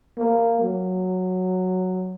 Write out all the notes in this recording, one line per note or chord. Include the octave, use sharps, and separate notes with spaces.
A#3
F#3